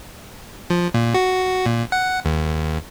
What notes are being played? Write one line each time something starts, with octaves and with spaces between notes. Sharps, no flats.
F3
A#2
F#4
A#2
F#5
D#2